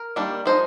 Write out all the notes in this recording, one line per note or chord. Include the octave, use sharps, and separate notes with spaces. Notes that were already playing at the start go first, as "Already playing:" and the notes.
Already playing: A#4
D#3 G3 A#3 D4
F3 G#3 D#4 C5